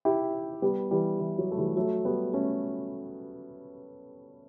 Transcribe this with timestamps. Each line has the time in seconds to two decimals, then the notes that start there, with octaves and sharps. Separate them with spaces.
0.05 E4 G4
0.62 G3 B3
0.91 E3 G3
1.19 E3
1.38 F#3
1.51 A3
1.57 E3 G3
1.77 F#3 A3
2.05 G3 B3
2.33 A3 C#4